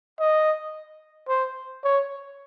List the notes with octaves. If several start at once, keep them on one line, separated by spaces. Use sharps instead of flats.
D#5
C5
C#5